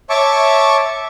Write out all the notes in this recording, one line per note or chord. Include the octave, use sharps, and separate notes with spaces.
C#5 E5 A5 C#6 D6